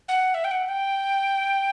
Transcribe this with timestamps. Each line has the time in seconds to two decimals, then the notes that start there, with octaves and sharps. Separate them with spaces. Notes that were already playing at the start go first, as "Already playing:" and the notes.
0.08 F#5
0.34 E5
0.44 G5
0.51 F#5
0.68 G5